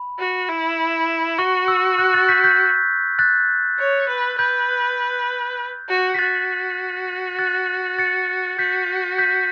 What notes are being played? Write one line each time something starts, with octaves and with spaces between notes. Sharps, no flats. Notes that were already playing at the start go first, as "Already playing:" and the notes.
Already playing: B5
F#4
E4
F#4 C#6
E6
F#6
F#6 A6
G6 B6
G6 B6
F#6 A6
C#5
B4
B4 G6
F#4
B6
F#4 F#6 A6
F#6 A6
A6 C#7
F#4 G6 B6
G6 B6